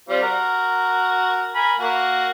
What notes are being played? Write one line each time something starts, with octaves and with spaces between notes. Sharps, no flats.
G3 C4 F4
F#4 A#4
A#4 G#5 B5
A#3 F#4